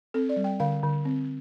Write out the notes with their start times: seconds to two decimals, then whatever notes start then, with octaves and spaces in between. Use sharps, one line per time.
0.14 C4 A4
0.29 D5
0.36 G3
0.44 G5
0.60 D3 F5
0.83 D3
1.05 C4